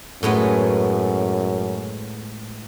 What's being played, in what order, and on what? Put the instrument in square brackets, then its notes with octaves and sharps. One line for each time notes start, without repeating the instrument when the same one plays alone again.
[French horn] F#2 [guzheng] A2 G#3 B3